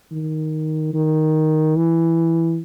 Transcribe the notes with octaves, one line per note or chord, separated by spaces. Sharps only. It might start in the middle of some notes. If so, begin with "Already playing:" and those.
D#3
D#3
E3